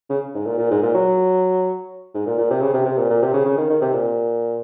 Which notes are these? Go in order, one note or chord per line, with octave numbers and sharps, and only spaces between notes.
C#3
G#2
A#2
A#2
G#2
A#2
F#3
G#2
A#2
A#2
C3
C#3
C3
C3
A#2
A#2
C3
C#3
C#3
D#3
D#3
C3
A#2